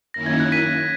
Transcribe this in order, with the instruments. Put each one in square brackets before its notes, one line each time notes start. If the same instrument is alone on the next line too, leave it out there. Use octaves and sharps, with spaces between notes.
[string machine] F#2 D#3 A#3 C#4 E4 [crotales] A#6
[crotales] G#6
F#6
B6 D#7